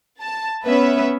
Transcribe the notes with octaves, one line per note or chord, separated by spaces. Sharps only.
A5
B3 C#4 B4 E5